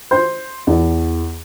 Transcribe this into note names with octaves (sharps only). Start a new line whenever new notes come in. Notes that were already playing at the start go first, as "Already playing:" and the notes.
C5
E2